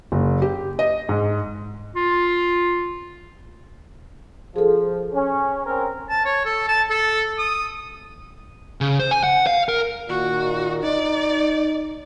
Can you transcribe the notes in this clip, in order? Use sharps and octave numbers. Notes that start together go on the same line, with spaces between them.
F#1
G4
D#5
G#2
F4
F3 G#4 A4
C#4
C4 C#4 A#4
A5
C#5
A4
A5
A4
D#6
C#3
C5
G#5
F#5
F5
A#4
A#2 D#3 F#4
D#4 D5